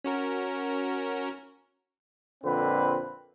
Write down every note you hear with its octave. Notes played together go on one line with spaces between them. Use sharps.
C#4 F#4 A#4
F2 A#2 D3 C4 F4 B4